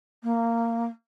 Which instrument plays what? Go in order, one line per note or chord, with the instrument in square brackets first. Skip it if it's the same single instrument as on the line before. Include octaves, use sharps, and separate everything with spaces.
[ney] A#3